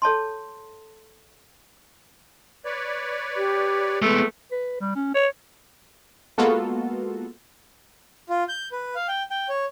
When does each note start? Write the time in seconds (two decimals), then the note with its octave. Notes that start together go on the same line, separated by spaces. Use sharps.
0.02 A4 C#5 A5 C6
2.65 B4 C#5 D5
3.37 G4
4.02 G#3 A3 B3
4.51 B4
4.80 G3
4.96 C#4
5.14 C#5
6.38 G#3 A#3 B3 F4 F#4 A4
8.29 F4
8.49 G6
8.72 B4
8.95 F5
9.08 G5
9.31 G5
9.49 C#5